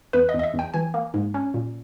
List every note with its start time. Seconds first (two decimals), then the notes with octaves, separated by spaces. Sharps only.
0.13 E2 B4
0.29 D#5
0.34 E2
0.39 D#5
0.43 E5
0.54 E2
0.59 G5
0.74 E3 G#5
0.94 A#3
1.14 G#2
1.34 C#4
1.54 A#2